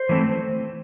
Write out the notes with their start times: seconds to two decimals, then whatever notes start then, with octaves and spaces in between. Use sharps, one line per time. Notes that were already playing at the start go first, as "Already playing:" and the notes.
Already playing: C5
0.09 E3 A3 C4